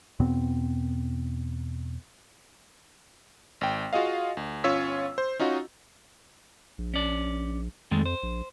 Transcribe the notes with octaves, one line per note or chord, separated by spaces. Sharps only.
E2 B2 B3 C4
G#1 G5
F4 F#4 G#4 D#5 F5
D2
G1 C#4 F4 C#5 E6 B6
C5
C#4 D#4 F4 F#4
A#1
C#4 D5
F2 D#3 G#3 A3
C5
A#1